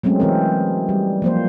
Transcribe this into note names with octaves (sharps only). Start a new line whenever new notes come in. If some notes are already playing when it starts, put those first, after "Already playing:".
F#3 G#3 A3 C4 C#4
E3 C4 A#4
G3
F3 A#3 C5